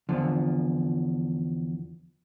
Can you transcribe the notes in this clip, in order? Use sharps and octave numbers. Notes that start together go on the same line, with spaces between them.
E2 D3 F3